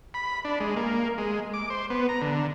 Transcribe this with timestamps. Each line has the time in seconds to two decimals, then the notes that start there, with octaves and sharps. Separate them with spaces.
0.14 B5
0.45 D4
0.60 G#3
0.76 A#3
1.18 G#3
1.54 D6
1.70 C5
1.90 B3
2.09 A#5
2.22 D3